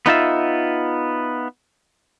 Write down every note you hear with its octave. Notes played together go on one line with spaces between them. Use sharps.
B3 D#4 F4 E5